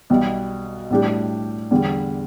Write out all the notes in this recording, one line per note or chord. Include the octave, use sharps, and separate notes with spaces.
B1 B2 G3
A2 G3 D4 G4
E2 D3 G3